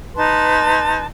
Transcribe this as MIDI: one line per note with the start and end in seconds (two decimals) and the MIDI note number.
0.16 1.05 63
0.16 1.05 71
0.16 1.05 81
0.16 1.05 84